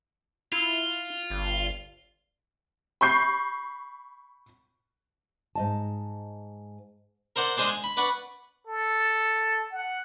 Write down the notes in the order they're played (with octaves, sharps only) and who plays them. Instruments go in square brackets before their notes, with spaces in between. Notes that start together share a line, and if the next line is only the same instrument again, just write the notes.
[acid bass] E4 [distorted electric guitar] F4
[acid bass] G1
[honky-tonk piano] B5 C#6 G6 C7
[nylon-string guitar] G#2 D#5 A5
[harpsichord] A#4 C5 D5 F#5
G#3 D4 G#4 C5 D5
G#5
B5
B4 D5 F#5 B5 C#6
[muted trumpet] A4
F#5